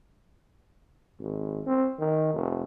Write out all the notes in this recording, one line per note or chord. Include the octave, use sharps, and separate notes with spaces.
G#1
C4
D#3
F1